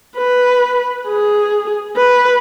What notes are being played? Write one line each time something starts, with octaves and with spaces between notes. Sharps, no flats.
B4
G#4
B4